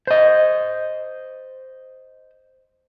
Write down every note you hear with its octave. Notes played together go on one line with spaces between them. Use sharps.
C5 D#5